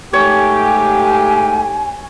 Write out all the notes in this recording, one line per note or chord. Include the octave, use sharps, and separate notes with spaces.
G#2 A3 G4 C#5 G#5